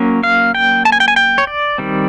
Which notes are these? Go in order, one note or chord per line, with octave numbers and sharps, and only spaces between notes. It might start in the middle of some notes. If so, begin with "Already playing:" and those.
Already playing: F#3 A#3 C#4
F5
G5
A5
G#5
G5
G#5
G5
C#5
D5
D#3 G3 C4